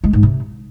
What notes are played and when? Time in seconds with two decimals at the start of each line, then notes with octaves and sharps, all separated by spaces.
0.04 G#3
0.13 G#2
0.23 C3